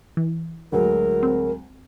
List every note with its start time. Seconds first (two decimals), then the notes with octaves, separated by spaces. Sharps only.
0.17 E3
0.72 D2 F#3 G#3 A#4
1.23 C4